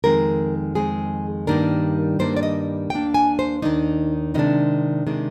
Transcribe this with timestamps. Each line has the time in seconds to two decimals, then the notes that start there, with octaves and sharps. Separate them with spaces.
0.04 F2 D#3 G#3 C4 A#4
0.75 F2 D#3 G#3 C4 G#4
1.47 G2 D#3 G3 A#3 D4 A#4
2.19 G2 D#3 G3 A#3 D4 C5
2.37 D5
2.43 D#5
2.90 D#2 D#3 A#3 D4 G5
3.14 G#5
3.39 C5
3.62 D#2 D#3 A#3 D4 D#4
4.34 C3 D#3 G#3 D4 D#4
5.07 C3 D#3 G#3 D4